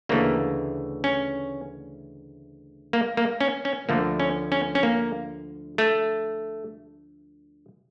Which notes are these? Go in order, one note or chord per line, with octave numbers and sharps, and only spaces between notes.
D2 C#3 E3 A3 A#3
C#4
A#3
A#3
C#4
C#4
D2 D3 F3 A3 A#3
C#4
C#4
C#4
A#3
A3